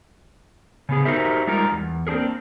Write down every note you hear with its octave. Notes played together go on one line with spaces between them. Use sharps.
C#3 B3 G#4
D#4 F#4 G4 A#4 C5 E5
G3 G#3 D#4 F4 A#4
E2
A#3 C4 D4 G#4 A#4